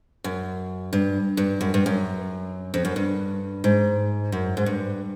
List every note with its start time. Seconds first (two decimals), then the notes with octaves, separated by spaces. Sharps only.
0.24 F#2
0.93 G2
1.37 G2
1.61 F#2
1.74 G2
1.86 F#2
2.74 F2
2.85 F#2
2.96 G2
3.64 G#2
4.32 F#2
4.57 G#2
4.66 G2